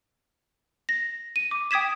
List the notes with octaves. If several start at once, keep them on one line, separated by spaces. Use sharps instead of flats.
A#6
D#7
D6
G5 D#6 G#6 B6 E7